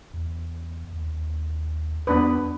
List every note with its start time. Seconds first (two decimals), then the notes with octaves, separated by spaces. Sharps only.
0.14 E2
0.93 D#2
2.07 E2 B3 D4 B4